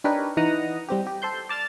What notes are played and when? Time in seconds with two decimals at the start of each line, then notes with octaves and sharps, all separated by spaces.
0.04 D4 D#4 G4 A#4 B4 C#5
0.37 E3 D#4 F#5 A#5 D#6
0.88 G3 C4 G4
1.07 G4
1.22 A4 C5 C6 G6
1.49 D5 A5 F6 A6